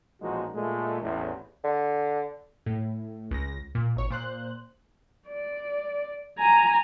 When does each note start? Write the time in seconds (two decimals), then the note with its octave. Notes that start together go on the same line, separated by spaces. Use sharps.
0.21 A1 A#2 F3 G#3 D#4 F#4
0.55 A#2 G#3 A3
1.01 A1 E2
1.64 D3
2.66 A2
3.31 C#2 A#6
3.75 A#2
3.96 G#1 C#5
4.10 A#2 C5 F#6
5.28 D5
6.38 G#5 A#5